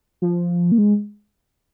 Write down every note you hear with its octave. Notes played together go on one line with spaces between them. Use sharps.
F3
A#3
G#3